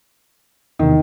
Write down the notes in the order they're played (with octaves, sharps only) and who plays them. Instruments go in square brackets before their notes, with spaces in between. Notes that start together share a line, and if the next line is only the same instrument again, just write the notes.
[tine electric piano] E2 C3 [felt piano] D#3